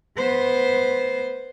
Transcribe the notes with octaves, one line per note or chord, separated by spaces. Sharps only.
B3 C5